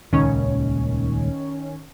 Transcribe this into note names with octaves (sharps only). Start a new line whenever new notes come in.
D#1 C#2 D#3 C#4 C#5